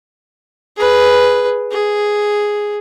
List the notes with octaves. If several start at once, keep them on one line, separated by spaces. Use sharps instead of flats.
G#4 B4
G#4